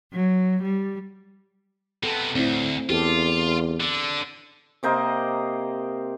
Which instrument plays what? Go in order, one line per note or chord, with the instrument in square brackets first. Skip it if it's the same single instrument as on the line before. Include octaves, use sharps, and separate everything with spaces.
[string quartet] F#3
G3
[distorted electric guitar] C3 B3 [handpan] A4
[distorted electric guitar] D2 [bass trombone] A2 [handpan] C4 E4
[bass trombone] E2 [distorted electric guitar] F4 [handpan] G4 A4
[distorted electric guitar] D3
[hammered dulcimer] C3 A#3 C5 D#5